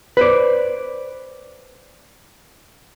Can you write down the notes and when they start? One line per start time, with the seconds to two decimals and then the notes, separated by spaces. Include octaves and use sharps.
0.17 B4 C5 D5